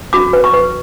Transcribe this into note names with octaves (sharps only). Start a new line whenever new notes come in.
F#4 D6
B4
C#6
B4